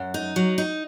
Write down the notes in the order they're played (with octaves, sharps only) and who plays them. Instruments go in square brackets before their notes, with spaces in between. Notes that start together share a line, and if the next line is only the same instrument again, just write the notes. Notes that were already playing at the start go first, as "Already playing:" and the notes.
Already playing: [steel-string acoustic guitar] F#2 [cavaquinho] F#5
[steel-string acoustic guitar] D#4
F#3
D#4